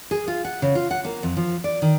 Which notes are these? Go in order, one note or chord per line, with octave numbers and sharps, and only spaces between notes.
G#4
F4
F#5
C#3
F4
F#5
A#3
F2
F3
D5
D#3